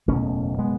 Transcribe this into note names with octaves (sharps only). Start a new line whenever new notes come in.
F#1 E2 B2 A3 C#4
G#3 B3